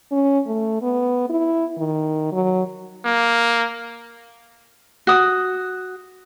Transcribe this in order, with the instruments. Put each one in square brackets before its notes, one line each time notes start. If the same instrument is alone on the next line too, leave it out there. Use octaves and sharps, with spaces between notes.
[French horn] C#4
A3
B3
E4
D#3
F#3
[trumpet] A#3
[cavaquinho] F#4 D#6